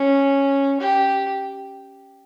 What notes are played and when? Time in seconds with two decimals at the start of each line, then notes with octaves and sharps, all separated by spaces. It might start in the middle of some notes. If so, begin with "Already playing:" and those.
Already playing: C#4
0.81 G4